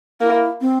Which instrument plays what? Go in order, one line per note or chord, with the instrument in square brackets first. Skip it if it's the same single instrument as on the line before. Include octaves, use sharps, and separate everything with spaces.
[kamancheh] A#3 [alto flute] E4
[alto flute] C4